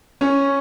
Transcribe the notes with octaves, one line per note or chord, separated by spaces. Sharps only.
C#4